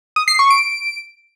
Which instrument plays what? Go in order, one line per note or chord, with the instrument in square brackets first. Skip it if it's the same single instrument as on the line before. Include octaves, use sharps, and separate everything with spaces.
[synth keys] D#6
C7
C#6
D7